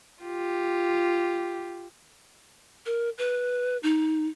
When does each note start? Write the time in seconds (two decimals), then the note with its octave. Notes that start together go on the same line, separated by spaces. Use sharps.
0.22 F4 G4
2.86 A#4
3.18 B4
3.83 D#4